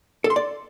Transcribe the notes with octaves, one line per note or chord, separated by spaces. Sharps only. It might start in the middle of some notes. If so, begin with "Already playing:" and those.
A4
C6
D5